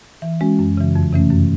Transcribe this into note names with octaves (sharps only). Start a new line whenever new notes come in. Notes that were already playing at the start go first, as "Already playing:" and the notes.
E3
G#3 C#4 F#4
F#2
C#3 E3
F2
C3 E3 A3 C#4
F#2